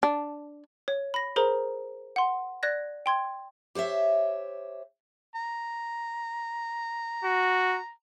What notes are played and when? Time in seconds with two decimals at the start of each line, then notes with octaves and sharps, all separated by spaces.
0.03 D4
0.88 C#5
1.14 B5 A#6
1.36 G#4 A#4 C5 A#5
2.16 F#5 C6
2.63 D5 F#6 G#6 A#6
3.06 G5 C6 G#6
3.75 G4 C5 C#5 E5
5.35 A#5
7.24 F#4